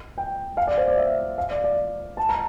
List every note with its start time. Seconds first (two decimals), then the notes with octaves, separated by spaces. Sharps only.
0.18 G5
0.57 F5
0.67 D5
0.78 C5
0.88 D5
0.97 E5
1.38 F5
1.51 D5
1.64 D5
2.17 A5
2.29 A#5